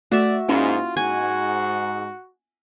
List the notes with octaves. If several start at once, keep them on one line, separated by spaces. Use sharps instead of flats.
A3 F#4 D5 E5
G#2 A#3 C#4 E4 F4
G#2 F#4 G#5